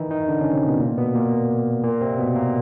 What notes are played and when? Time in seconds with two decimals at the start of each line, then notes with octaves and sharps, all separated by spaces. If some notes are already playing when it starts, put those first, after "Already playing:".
Already playing: D#3 E3 D#4 E4
0.11 D#3 D#4
0.28 D3 D4
0.41 C#3 C#4
0.54 C3 C4
0.67 B2 B3
0.80 A#2 A#3
0.98 B2 B3
1.15 A#2 A#3
1.84 A#2 A#3
2.01 C3 C4
2.18 B2 B3
2.35 A#2 A#3